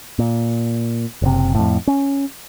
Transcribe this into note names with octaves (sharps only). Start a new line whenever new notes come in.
A#2
F#1 C3
F2 A2
C#4